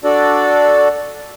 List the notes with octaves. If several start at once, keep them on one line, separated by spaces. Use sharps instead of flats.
D4 F#4 A4 D5